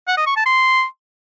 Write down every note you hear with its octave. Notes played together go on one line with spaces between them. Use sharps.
F#5
D#5
C#6
A5
C6